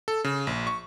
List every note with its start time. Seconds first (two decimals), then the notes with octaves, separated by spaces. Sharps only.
0.08 A4
0.24 C#3
0.47 A#1
0.67 C#6